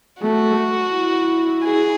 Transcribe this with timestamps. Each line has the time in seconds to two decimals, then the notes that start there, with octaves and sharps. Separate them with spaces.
0.22 A3 F#4
0.93 E4
1.64 G#4